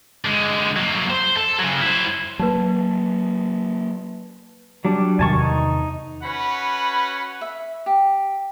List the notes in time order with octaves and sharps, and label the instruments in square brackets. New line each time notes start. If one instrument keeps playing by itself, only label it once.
[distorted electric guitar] D3 G#3
F#3 A#3
C5
A4
C#3 F#3
E4 C5
[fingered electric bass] F#3 A#3 [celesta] B4 A5
[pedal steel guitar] F#3 G3 D4
[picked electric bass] E2 C3 D#3 [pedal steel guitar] G#5 A5 C#6
[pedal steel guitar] D#4
[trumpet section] C#4 F#4 B4 F#5 B5
[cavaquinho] E5
G4